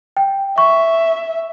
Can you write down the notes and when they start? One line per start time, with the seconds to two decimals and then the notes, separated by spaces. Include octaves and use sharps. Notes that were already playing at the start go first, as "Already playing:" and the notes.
0.17 G5
0.58 E5 C#6